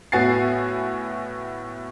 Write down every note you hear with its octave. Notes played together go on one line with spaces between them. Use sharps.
A2 B3 F#4 G#5 A6 C7